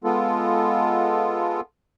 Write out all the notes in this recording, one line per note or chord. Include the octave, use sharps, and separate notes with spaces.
G#3 B3 F4 A4